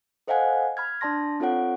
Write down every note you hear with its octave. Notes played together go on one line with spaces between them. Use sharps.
A4 C5 D#5 F5 F#5 G#5
B5 F6 G#6
D4 D5 A5 C6 A#6
C4 F4 A4 C#5 F#5 D7